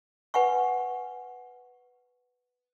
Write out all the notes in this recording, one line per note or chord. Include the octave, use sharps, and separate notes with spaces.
B4 F#5 G#5 C#6